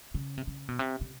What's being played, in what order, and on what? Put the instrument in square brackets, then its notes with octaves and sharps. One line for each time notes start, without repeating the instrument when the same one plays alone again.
[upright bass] C#3
C3
C#3
B2
C3
C3